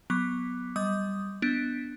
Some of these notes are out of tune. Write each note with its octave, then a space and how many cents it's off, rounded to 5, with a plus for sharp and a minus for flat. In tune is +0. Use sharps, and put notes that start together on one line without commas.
F#3 +0 B3 +0 D6 +0
G3 +0 D#5 +15 D#6 +0
B3 +0 D4 +0